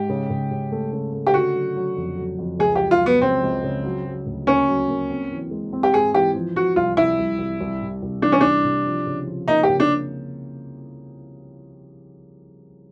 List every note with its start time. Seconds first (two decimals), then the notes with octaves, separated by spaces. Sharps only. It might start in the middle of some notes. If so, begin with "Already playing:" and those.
Already playing: G#2 G4
0.09 C#3
0.30 C#3
0.51 C#3
0.72 A3
0.93 C#3
1.13 A3
1.27 G4
1.34 D3 F#4
1.55 F#3
1.76 F#3
1.97 F2
2.17 F#3
2.39 F2
2.59 C#2 G#4
2.76 F#3 G4
2.91 F4
3.02 F#3 B3
3.21 C#3 C4
3.44 C#2
3.64 C#3
3.84 F#3
4.05 F#3
4.26 D2
4.47 A#3 C#4
4.68 F#3
4.89 A#3
5.10 C4
5.31 E3
5.51 G#3
5.73 C4
5.83 G4
5.93 G#2 G#4
6.14 E3 G4
6.35 F3
6.56 F3 F#4
6.76 C2 F4
6.97 C2 E4
7.19 C2
7.39 C2
7.61 C2
7.82 C3
8.02 C2
8.22 E3 D4
8.32 C#4
8.41 C2 D4
8.64 C3
8.85 F3
9.07 C#3
9.27 F3
9.48 A#3 D#4
9.63 G4
9.69 C#3
9.80 D4